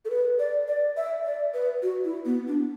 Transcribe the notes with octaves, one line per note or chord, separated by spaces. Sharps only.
A4
B4
D5
D5
E5
D5
B4
F#4
E4
B3
D4